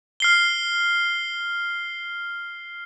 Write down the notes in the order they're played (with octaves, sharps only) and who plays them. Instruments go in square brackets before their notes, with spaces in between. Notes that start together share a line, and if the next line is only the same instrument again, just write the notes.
[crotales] F6 C7 G7